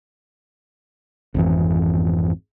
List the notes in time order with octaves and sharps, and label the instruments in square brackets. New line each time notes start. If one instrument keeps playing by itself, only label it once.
[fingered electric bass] G#1 F2 E3